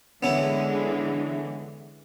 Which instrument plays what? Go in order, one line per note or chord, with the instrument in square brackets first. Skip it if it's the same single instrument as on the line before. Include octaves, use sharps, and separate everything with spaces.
[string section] D3 E3 G#3 [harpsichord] B3 C#4 E4